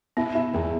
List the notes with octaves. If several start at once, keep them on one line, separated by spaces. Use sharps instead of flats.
B3 E4
E4
E2 B3